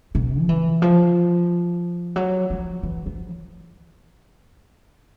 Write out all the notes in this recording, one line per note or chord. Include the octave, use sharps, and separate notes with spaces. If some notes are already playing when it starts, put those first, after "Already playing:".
B2
F3
E3
F3
F#3
F3
E3
F3